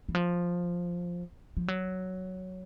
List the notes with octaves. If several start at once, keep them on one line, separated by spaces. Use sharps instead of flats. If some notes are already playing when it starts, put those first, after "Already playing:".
E3
F3
F3
F#3